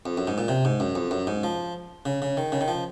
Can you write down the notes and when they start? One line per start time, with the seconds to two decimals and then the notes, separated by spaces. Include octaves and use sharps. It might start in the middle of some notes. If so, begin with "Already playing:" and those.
0.06 F2
0.17 F#2
0.27 G#2
0.38 A#2
0.48 C3
0.65 G#2
0.80 F#2
0.95 F2
1.11 F#2
1.27 G#2
1.43 F3
2.06 C#3
2.22 C#3
2.37 D#3
2.52 C#3
2.61 D#3
2.68 F3